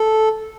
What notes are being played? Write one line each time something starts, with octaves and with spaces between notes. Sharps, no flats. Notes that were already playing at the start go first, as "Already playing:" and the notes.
Already playing: A4